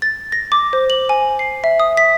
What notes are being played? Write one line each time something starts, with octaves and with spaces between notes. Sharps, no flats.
A6
A#6
D6
C5
F#7
G#5
C7
E5
D#6
B6